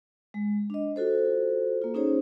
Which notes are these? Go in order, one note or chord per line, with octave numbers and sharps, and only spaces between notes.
G#3
D4 D#5
F4 F#4 A4 C5
A#3 F4
C#4 D#4 F4 G#4 C5 C#5